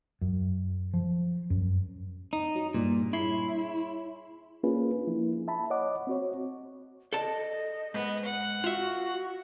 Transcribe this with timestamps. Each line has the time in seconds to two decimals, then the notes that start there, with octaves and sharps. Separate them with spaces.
0.21 F#2
0.94 F3
1.50 F#2
2.33 D#4
2.55 F#3
2.74 G2 A#2
3.13 E4 G#4 C#5 C6
4.63 A#3 C#4 D4 F4 G#4 B4
5.07 F3 A#3 E4
5.48 E5 A5 B5
5.70 C#5 D#5 F#5 D6
6.07 C4 F#4 C#5
7.13 A4 D5 D#5 A5
7.94 G#2 B3
8.25 F#5
8.64 F4 F#4 E5